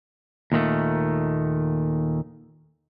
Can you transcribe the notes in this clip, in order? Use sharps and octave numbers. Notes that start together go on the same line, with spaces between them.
D#2 A#2 D#3 A3